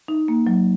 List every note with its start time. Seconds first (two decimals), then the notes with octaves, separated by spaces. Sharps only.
0.08 D#4
0.28 A#3
0.47 F#3